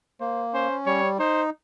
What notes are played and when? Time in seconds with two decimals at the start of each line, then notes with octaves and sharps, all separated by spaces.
0.20 A#3 C5
0.53 C#4 C5
0.86 G3 C#5
1.19 D#4 C5